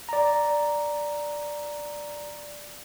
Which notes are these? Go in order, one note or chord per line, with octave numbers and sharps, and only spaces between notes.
D5 A#5